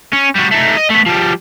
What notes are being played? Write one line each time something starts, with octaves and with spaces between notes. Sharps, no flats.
C#4
G3 F#4
A3 D#4
D#5
A3 B3
F3 G3